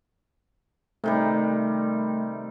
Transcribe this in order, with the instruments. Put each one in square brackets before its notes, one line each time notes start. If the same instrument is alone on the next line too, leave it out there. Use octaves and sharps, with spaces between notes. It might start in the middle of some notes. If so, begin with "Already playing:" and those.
[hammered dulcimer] C3 D#3 G3 [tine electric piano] A3